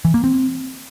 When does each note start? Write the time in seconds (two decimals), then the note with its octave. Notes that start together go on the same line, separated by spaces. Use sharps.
0.05 E3
0.14 A#3
0.24 C4